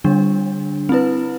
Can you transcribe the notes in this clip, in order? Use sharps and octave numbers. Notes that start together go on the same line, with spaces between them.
D3 G3 D4
C4 E4 B4